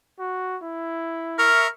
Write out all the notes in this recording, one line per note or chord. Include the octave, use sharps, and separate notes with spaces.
F#4
E4
A#4 E5 C#6 F6